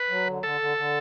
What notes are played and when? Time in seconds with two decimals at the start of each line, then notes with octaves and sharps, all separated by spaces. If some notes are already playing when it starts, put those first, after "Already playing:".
Already playing: B4
0.09 F#3
0.27 D3
0.43 D3 A4
0.61 D3
0.77 D3